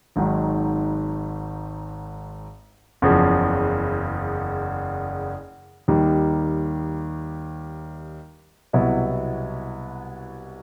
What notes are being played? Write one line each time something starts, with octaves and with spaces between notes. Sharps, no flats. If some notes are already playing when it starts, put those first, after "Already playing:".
G#1 G#2 D#3 F#3
F#1 E2 C#3 F3
D#2 D#3 G3
C2 B2 F#3 B3 E4